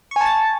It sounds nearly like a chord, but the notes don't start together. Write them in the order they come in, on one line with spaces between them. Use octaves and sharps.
C#6 G#5 A5 A6